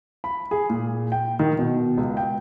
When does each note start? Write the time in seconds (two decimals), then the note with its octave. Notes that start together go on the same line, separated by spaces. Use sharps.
0.24 B5
0.51 G#4
0.70 A#2
1.12 G5
1.39 D#3
1.59 B2
1.97 C#2
2.17 G5